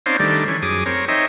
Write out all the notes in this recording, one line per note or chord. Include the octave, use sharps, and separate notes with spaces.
C4 C#4 D#4 C5 D5 F5
D#3 G3 A3 D4
E3 C#4
F#2 G#4 D6 D#6
C4 A#4 C#5
D#4 C5 C#5 D#5 E5 G5